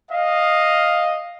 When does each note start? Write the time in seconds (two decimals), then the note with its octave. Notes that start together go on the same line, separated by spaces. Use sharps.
0.11 D#5 F5